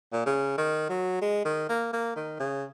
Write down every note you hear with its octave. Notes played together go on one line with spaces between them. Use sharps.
A#2
C#3
D#3
F#3
G#3
D#3
A#3
A#3
D#3
C#3